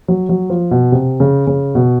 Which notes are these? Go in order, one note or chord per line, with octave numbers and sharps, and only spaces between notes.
F#3
F#3
F3
B2
C3
C#3
C#3
B2